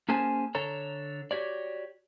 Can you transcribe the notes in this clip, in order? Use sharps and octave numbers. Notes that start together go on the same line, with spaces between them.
A#3 C#4 G#4 C5 G#5 A5
D3 A4 C#5 A#5
F#4 G4 C#5 D5